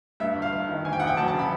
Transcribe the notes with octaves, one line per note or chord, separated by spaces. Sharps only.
G2 E5
E5
G1
F5
G1 F5
D#3
D2 G#5
G5
E1 F#5
G5
F#3 A5
A5
C#3
B5